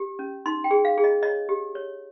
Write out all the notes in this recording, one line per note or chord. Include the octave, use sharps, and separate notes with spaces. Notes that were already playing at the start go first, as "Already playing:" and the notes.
Already playing: G4
C#4
D#4 C6
G5
G#4
F5
G#4
D#5
C#5 D#5
G4
C#5